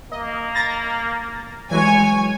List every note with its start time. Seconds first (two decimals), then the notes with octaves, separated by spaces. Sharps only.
0.12 A#3 D#5
0.54 A#5 A6 A#6
1.71 E3 F#3 G#3 C#5 G#5